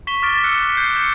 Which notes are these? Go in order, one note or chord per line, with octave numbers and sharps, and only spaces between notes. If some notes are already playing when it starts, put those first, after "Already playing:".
C#6 B6 E7 G7
D6 F6 A6 D7
E6 F#6 C#7
E6 F#6 B6
G6 C7
C#7 E7